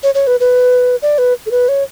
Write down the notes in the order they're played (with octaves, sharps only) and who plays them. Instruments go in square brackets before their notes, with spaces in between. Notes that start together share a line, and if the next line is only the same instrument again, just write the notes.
[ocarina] C#5
C#5
B4
B4
D5
B4
A4
B4
C#5